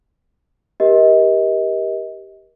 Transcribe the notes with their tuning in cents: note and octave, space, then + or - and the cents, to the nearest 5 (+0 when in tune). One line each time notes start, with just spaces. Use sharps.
G4 +0 A#4 +30 D#5 +30